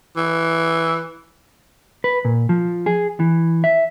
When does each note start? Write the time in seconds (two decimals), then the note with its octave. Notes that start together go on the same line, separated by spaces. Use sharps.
0.17 E3
2.04 B4
2.25 A#2
2.49 F3
2.86 G#4
3.20 E3
3.64 E5